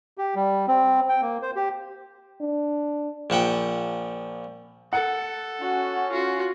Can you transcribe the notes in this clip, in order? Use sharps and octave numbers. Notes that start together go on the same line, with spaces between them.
G4
G3
C4
G5
A#3
C5
G4
D4
A#1 F3 F#5 G5
A4 F#5
C#4 F#4
F4 F#4